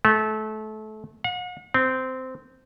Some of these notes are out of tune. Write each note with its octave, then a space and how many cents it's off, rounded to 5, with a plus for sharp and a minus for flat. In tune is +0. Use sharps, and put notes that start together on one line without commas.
A3 -25
F#5 -40
C4 -15